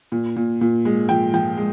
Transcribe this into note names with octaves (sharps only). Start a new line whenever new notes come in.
A#2
A#2
A#2
G#3
F3 G5
F3 G5
G#3